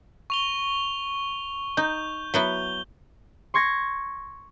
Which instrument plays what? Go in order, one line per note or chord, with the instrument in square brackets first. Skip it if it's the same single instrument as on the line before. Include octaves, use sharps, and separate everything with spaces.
[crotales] C#6 F7 G7
[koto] D#4 [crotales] G6
[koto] F#3 B3 E4 [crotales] G7
[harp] C6 C#6 G#6 A#6